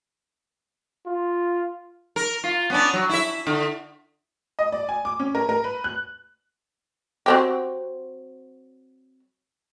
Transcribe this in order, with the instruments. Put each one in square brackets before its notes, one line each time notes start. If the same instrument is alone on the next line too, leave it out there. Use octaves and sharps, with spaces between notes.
[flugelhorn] F4
[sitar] A#4
F4
B3 C#4 D4
F#3
E4 E5
D3
[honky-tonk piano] D#5
D5
G#5
D6
C#4
A#4
A#4
B4
F#6
[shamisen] F#3 C4 G4